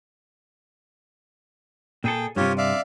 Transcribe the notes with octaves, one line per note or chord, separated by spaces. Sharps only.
A#2 G#4 A4 G5
G2 C3 F4 G4 C#5
D5 E5 F5